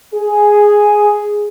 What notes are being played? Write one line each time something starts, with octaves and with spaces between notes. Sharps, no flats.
G#4